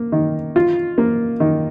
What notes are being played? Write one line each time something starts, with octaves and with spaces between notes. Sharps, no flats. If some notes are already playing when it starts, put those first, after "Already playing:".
Already playing: A#3
D#3
F4
A#3
D#3